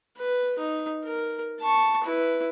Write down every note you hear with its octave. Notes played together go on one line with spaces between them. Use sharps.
B4
D#4
A#4
A5 C#6
E4 B4